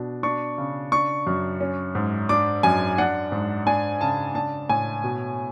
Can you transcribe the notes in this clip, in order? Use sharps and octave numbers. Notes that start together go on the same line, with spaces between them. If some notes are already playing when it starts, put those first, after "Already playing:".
Already playing: B2 D4
D4 C#6
C#3
D4 C#6
F#2
C#4
G#2
D4 D6
F#2 G#5
D4 F#5
G#2
D4 G#5
C#3 A5
D4 A5
A2 G#5
B2